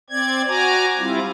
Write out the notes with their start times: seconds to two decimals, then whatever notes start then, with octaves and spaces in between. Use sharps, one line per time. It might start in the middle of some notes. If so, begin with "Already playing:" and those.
0.10 C4 D5 G#6
0.48 F#4 G#5 A#5 D6
0.99 G3 C4 E4 F4